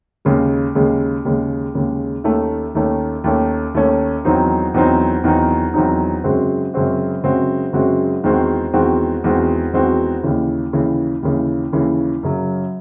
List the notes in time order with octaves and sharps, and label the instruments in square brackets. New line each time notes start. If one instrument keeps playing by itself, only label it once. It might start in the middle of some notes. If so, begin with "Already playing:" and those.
[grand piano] D#2 C#3 G#3
D#2 C#3 G#3
D#2 C#3 G#3
D#2 C#3 G#3
D#2 D#3 A3 C#4
D#2 D#3 A3 C#4
D#2 D#3 A3 C#4
D#2 D#3 A3 C#4
E2 D#3 F#3 C4 D#4
E2 D#3 F#3 C4 D#4
E2 D#3 F#3 C4 D#4
E2 D#3 F#3 C4 D#4
F#2 C#3 G#3 C4 F#4
F#2 C#3 G#3 C4 F#4
F#2 C#3 G#3 C4 F#4
F#2 C#3 G#3 C4 F#4
E2 D#3 G#3 C4 F#4
E2 D#3 G#3 C4 F#4
E2 D#3 G#3 C4 F#4
E2 D#3 G#3 C4 F#4
D#2 C#3 E3
D#2 C#3 E3
D#2 C#3 E3
D#2 C#3 E3
F#2 C#3 F#3